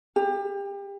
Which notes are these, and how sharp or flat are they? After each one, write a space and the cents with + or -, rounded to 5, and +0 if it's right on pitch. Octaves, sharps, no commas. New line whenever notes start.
G4 +30